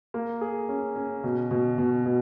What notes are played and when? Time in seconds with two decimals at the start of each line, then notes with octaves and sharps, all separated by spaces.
0.14 A#3
0.41 G#4
0.69 C#4
0.96 C#4
1.24 B2
1.51 B2
1.78 B2
2.06 B2